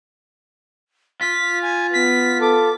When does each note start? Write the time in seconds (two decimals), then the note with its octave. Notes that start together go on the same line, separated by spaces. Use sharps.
1.21 F4 B6
1.62 G#5
1.93 B3 B6
2.41 A4 D6